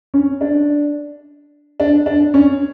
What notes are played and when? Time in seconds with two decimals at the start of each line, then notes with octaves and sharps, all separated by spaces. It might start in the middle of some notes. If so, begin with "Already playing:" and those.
0.14 C#4
0.41 D4
1.80 D4
2.06 D4
2.34 C#4